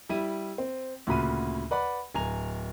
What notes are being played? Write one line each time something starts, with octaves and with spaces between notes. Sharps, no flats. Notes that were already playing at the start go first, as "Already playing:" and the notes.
G3 E4 D#7
C4
D2 A#2 C#3 F#4 B5 D#7
B4 D5 F#5 B5
D1 G#5 A#5 F7